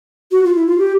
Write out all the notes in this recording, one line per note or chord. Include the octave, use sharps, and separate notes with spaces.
F#4
F4
E4
F4
G4